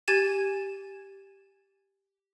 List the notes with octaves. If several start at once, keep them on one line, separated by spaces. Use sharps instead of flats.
G4 G#5 G#6 A6 D#7 E7